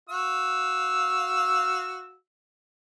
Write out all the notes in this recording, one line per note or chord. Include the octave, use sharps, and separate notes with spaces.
F#4 F5 E6